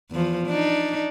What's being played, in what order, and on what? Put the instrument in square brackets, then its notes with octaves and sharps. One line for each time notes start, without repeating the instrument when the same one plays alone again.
[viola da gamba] E2 F3
D4 D#4